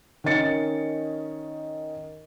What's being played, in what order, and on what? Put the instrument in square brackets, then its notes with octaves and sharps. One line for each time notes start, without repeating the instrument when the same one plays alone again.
[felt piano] D#3 C#4 D#5 A6 C#7